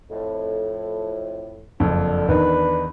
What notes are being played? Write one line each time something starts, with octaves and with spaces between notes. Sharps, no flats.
F2 A2
F#1 F2 D3
E2 D#3 D4 D#4 B4